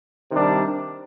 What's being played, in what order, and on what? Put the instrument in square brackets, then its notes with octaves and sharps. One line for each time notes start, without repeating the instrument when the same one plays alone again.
[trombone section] C3 D#3 G3 D4